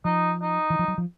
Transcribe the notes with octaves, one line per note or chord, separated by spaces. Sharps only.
F3 D#4
D#4
E3
F3
F#3
F3